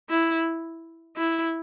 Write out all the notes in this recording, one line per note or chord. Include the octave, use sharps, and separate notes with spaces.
E4
E4